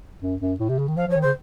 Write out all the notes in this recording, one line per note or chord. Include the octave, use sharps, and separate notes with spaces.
F#2
F#2
A2
C3
C#3
D#3
F3 F5
F3
C#5
D#3
C#3 C5